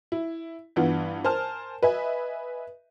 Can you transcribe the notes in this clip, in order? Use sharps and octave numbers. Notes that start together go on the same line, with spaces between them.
E4
G2 E3 B3 F4
A#4 C5 G#5 A5 F6
B4 D#5 E5 G#5